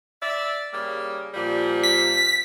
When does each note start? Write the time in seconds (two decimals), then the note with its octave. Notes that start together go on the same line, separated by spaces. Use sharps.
0.21 D5 E5
0.73 C#3 G3 A#3
1.34 A#2 F3 G3
1.84 B6